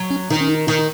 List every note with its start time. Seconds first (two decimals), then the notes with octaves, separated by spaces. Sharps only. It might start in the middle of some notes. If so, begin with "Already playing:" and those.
Already playing: F#3
0.11 C#4
0.30 D#3 D#4
0.41 C#4
0.49 D#4
0.67 D#3 D#4